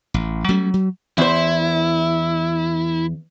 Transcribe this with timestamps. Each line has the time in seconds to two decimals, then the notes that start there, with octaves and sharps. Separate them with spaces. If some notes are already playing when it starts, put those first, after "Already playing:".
0.14 A1
0.49 F#3 G3 A3 C#4
0.74 F#3
1.18 E2 E4 C5